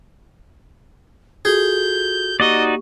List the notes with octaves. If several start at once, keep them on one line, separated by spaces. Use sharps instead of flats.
F4 F#4 G#4 A4 G6
A#3 D#4 F#4 G4 D5 D#5 C#6